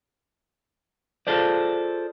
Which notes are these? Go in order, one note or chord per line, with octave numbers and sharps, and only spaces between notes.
F4 G#4 A4 C5 D5